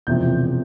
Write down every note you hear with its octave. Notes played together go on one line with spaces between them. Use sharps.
E1 E2 C3 F3 G6